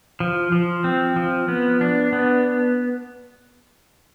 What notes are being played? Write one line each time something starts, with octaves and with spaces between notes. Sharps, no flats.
F3
F3
C4
F3
B3
D4
B3